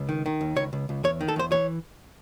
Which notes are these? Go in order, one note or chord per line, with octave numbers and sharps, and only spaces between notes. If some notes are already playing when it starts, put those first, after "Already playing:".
Already playing: C#2
D#3
D#3
D#2
C#2 C#5
C#2
C#2
E2 C#5
D#3
A4
E2 C5
E3 C#5